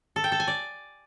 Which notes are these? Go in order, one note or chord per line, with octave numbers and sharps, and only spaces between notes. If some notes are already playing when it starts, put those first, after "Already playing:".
A4
G5
A4
G#5
D5